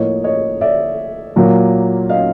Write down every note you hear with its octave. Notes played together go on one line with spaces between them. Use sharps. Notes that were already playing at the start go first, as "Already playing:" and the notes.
Already playing: A2 F3 A#3 C#5 D#5
C#5 D#5
D5 E5
A#2 F#3 A#3
D#5 F5